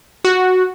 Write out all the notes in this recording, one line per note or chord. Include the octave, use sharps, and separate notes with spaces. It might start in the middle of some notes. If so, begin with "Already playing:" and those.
F#4